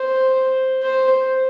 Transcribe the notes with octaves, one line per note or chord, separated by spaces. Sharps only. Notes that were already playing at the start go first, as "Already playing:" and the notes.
Already playing: C5
C5